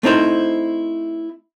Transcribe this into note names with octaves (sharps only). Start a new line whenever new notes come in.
A3 C4 D#4 E4 C5